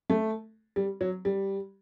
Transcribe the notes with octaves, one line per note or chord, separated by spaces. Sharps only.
A3
G3
F#3
G3